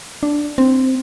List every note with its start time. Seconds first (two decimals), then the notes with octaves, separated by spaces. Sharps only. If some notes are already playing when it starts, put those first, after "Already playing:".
0.23 D4
0.58 C4